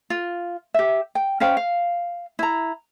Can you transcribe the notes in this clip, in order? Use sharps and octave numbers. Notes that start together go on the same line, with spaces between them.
F4
G4 E5
G5
C#4 C5 F5 G5
F5
E4 A#5